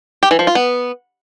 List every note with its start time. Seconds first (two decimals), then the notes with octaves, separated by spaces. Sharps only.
0.23 G4
0.31 E3
0.39 F3
0.47 F4
0.55 B3